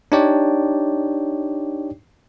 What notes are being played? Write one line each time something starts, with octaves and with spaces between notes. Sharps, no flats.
D4 D#4 G4 C#5 D5 G5